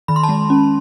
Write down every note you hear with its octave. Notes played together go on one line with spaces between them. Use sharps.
D#3 B5
C6
A5 B5
G#3
C#4